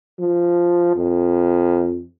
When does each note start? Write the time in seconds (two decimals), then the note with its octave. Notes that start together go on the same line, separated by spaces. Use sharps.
0.19 F3
0.96 F2